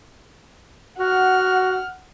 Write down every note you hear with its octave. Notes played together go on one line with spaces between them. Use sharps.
F#4 F#5 F6